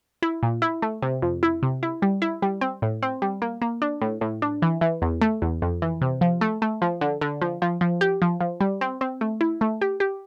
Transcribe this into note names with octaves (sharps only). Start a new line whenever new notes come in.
E4
A#2
E4
A3
C3
F2
E4
C3
E4
G3
E4
G3
C4
A2
C4
G3
A#3
A#3
D4
A2
A2
D4
E3
E3
E2
A3
E2
F2
E3
C3
F3
A3
A3
F3
D3
D3
F3
F3
F3
G4
F3
F3
G3
C4
C4
A3
E4
A3
G4
G4